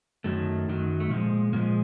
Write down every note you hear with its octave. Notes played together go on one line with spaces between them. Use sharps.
F#2 D#3 F#3 A3
F#2 D#3 F#3
A3
A#2 F3 G#3 A#3
A#2 F3 G#3 A#3